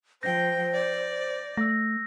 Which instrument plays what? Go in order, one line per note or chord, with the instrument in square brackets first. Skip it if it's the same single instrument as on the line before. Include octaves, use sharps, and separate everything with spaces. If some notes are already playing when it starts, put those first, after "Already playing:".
[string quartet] F3 G5 [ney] C5 [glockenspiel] G6 A#6
[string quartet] D5
[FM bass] A3 [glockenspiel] E6 A#6